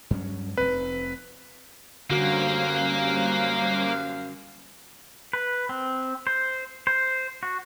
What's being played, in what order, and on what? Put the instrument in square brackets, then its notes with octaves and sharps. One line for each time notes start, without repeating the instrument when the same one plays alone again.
[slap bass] G2 F#3 C#4
[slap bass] F1 C4 [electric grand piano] B4
[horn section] F#2 F5 [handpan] D3 F#4 [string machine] G3 C#4 C5 [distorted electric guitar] A#3
[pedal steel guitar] B4
C4
C5
C5
F#4